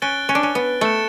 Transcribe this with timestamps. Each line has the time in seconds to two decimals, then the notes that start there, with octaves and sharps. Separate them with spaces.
0.02 C#4 F#6 A6 D7 G7
0.29 C#4
0.35 D4
0.43 C#4
0.55 B3
0.81 A3 A6 C#7 E7